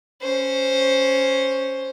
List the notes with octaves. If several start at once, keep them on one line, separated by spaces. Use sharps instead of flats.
C#4 C5